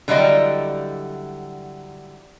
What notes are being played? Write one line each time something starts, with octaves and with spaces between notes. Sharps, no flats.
D3 F#3 G3 E4 D5 D#5